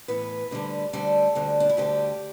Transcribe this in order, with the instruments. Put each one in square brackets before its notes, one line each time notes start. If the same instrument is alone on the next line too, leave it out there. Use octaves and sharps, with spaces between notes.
[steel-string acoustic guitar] A2 E3 B3 B4
D2 D3 G3
D2 D3 G3 A4
D2 D3 G3
D4
E4
D2 D3 G3 G4